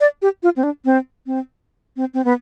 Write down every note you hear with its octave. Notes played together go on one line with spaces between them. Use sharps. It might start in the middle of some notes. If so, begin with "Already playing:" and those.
D5
G4
F4
C4
D4
C4
C4
C4
C4
B3